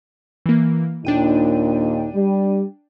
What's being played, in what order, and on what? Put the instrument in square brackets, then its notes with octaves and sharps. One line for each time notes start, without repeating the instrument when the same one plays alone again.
[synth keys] E3 A#3
[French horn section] D#2 A#2 D#4 [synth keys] D4 G5 D#7
[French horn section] G3